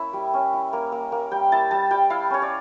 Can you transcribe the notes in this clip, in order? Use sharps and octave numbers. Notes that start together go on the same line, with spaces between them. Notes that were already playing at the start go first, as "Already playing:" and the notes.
Already playing: A#3 C#4 E4 E5
G3
C#4
E4
A#3
A#3
A#3
G3 G5
E4 A5
G3 A5
G3 G5
E4 F5
C#4 C#5
D5